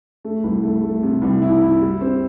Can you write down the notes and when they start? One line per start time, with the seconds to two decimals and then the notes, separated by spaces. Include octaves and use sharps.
0.25 A3
0.44 C2
0.63 A3
0.83 A3
1.03 C3
1.22 C2
1.42 E4
1.62 E4
1.81 G3
2.01 C4